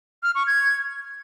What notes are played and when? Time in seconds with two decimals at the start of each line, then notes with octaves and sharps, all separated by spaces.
0.23 F6
0.35 C#6
0.47 G#6